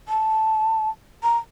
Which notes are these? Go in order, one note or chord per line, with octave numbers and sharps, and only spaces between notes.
A5
A#5